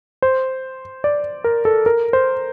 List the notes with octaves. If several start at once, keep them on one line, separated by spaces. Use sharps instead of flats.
C5
D5
A#4
A4
A#4
C5